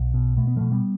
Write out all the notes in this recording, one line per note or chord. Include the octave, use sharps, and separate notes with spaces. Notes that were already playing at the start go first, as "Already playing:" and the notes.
Already playing: B1
B2
B2 A3
B3
B2 F3 A3
G3 B3